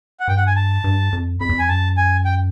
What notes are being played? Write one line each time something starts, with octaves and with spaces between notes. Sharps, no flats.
F#5
G2 G5
F#5
G#5
A5
G2
F2
F2 B5
E2
F2 G#5
F#2 A5
G#5
G5